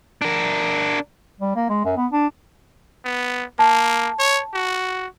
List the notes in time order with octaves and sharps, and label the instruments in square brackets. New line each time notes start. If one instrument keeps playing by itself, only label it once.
[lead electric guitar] D4 A#4
[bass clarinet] G3
A#3
G#3
F#2
B3
D4
[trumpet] B3
[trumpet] A#3 [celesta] A5
[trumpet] C#5
F#4